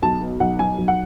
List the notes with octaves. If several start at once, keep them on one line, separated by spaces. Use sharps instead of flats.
B1 A5
B2
B1 F#5
F#3 G#5
B1
F#5